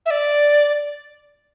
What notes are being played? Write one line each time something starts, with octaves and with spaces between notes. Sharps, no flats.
E5
D5